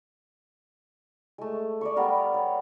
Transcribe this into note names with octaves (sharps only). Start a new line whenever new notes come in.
G#3 A3
D5 E5 C#6
G3 B3 A#4 F5
C#5